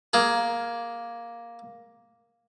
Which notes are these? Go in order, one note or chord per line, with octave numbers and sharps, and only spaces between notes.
A#3 G#4